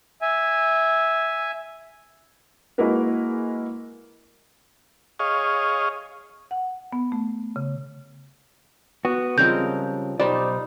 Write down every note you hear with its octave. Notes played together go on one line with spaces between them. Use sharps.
E5 G#5
G#3 A#3 E4 F#4 A#4 B4
G#4 C#5 D#5 F5
F#5
B3
A3
C#3
B3 F#4
C#3 F3 G3 G#3 C4 A#4 G6
B1 G3 D#4 C5 D5